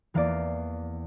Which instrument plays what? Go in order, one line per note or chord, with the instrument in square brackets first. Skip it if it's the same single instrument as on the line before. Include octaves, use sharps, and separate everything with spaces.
[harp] E2 E3 A#3 D5 F5